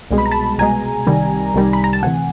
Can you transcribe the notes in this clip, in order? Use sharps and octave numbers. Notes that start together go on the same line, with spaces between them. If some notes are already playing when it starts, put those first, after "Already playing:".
C2 B2 G#3
B5
A#5
A5 B5
C2 B2 G#3 G#5 A#5
C2 C3 D#3 G3
C2 C3 D#3 G3
B5
A#5
A5
D2 C3 E3 F#5 G#5